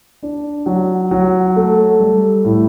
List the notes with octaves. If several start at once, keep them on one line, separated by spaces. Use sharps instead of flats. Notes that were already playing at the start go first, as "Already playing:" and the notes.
D4
F#3
F#3
A3
G3
A2